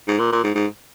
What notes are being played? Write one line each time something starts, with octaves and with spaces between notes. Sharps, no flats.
G#2
A#2
A#2
G#2
G#2